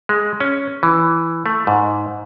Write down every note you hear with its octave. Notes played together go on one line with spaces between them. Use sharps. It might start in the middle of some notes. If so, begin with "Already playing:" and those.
G#3
C#4
E3
A3
G#2